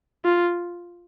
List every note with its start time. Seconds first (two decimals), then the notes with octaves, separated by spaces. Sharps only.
0.25 F4